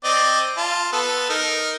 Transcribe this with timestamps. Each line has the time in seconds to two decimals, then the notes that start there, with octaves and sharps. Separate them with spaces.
0.04 C4 D5 D#5
0.57 F4 A5
0.93 B3 A4
1.30 D#4 A#4